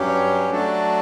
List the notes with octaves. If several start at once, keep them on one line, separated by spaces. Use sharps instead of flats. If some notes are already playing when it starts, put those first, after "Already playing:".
Already playing: G2 F#3 C#4 G4
F#3 A3 D4 F#4 A4